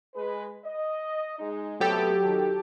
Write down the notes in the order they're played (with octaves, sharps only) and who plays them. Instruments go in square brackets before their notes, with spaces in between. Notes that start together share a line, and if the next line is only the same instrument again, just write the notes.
[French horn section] G#3 B4
D#5
G#3 D#4
[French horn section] C3 A3 B3 [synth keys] F#3 G4 A4
[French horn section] D#3